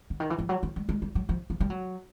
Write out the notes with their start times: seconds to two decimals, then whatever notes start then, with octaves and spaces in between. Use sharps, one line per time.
0.10 D3
0.20 D#3
0.30 E3
0.39 F3
0.49 F#3
0.63 F3
0.76 G3
0.89 G#3
1.02 G3
1.15 F#3
1.29 F3
1.50 F3
1.60 G3
1.70 F#3